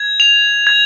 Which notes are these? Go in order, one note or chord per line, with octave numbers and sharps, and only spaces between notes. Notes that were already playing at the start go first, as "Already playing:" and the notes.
Already playing: G#6
F7
G#6